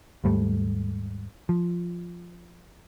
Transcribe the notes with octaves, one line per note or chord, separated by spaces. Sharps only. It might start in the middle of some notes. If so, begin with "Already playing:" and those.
D#2 G#2 G3 A3
F3